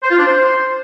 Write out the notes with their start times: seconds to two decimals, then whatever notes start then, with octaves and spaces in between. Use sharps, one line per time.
0.03 C5
0.10 F4
0.18 D4
0.26 C5